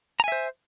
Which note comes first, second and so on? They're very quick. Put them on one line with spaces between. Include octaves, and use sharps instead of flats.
A#5 G#5 E5 C5